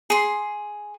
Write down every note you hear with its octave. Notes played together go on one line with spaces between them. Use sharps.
G#4 C6